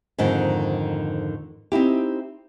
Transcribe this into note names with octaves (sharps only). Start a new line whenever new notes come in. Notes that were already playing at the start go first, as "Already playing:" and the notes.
F2 G#2 D3 D#3
C4 D#4 E4 G4